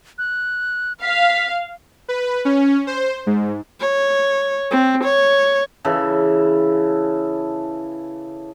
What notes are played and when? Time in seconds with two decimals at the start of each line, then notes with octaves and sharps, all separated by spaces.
0.18 F#6
1.02 F5 B6
2.08 B4
2.45 C#4
2.87 C5
3.26 G#2
3.80 C#5
4.71 C4
5.04 C#5
5.85 C#3 E3 A4